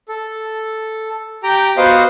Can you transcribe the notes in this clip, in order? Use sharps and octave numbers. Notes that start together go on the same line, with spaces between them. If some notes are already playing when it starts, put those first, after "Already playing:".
A4
G4 G5 A#5
B3 F#4 C5 D#5 F5